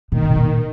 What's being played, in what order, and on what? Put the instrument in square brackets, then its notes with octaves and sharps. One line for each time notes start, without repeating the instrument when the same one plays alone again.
[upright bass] A#2 [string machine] D#3
[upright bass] C3
A#2